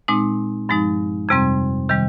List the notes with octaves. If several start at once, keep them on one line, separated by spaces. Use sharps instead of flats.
A#2 G#3 C4 D#4
G2 F3 G#3 D#4
F2 C3 G3 C4
C3 D#3 G3